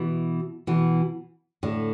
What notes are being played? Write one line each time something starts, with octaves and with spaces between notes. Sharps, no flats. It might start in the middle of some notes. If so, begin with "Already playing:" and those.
Already playing: B2 E3
B2 E3
A2 D3